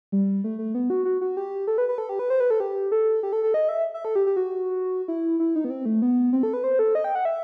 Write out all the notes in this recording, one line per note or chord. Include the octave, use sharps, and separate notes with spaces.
G3
A3
A3
B3
F#4
F#4
F#4
G4
A4
B4
B4
A4
G4
B4
C5
B4
A4
G4
A4
G4
A4
A4
D#5
E5
E5
A4
G4
G4
F#4
E4
E4
D#4
B3
C4
A3
B3
C4
A4
B4
C5
A4
D#5
G5
F#5
E5